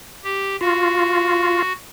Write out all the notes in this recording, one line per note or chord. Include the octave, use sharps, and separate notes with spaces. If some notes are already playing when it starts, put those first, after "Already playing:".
G4
F4 F#4